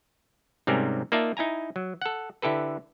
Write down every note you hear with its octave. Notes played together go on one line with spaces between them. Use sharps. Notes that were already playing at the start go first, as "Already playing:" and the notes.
G#2 C3 G3 C4 C#4 A#4
A#3 D#4 F4 D5 E5 A5
D#4 E4 G#5 A#5
F#3
A4 F#5
D3 E4 G4 A4 B4